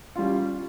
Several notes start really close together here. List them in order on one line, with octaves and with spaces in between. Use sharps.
F4 G3 C#4